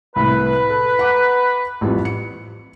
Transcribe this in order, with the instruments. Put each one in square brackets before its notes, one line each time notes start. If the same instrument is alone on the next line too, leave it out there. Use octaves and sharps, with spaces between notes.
[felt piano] C2 A2 [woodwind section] B4
[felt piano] A4
F#5 A#5 D6
A1 F2 G3
C#7